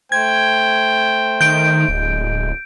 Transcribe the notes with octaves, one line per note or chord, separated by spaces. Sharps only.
A3 C5 G5 G#6
D#3 G6 D7
D1 G#3